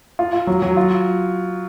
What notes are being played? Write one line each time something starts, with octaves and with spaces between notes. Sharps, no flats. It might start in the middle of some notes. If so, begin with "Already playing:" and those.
F4
F4
F#3
F#3
F4